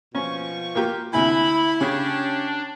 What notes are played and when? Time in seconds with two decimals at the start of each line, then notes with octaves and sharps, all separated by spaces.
0.15 B2 F3 C#4 C#6
0.75 A#3 F4 G4
1.13 D2 C3 E4 G#5 B5
1.81 C#3 C#4 D4 G4 C#5